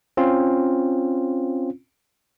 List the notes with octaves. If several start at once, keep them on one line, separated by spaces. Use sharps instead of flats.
C4 C#4 F4